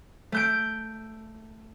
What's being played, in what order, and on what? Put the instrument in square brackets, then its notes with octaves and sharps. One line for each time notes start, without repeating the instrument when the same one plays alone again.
[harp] A3 G6 D7